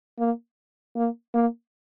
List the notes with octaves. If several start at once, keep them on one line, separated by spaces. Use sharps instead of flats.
A#3
A#3
A#3